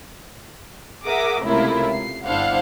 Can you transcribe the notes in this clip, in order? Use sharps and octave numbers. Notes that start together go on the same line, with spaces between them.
G#4 A#4 E5 F#5 D6 D#6
C#2 A2 C3 E4 F4 A#4
C7
G1 D4 E4 C5 F5 F#5